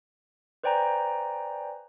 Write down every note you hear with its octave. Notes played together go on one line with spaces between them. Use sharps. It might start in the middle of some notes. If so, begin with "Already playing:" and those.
B4 C5 D5 G5 G#5 A#5